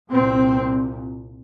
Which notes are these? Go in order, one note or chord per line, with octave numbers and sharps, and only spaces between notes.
C2 A#2 C4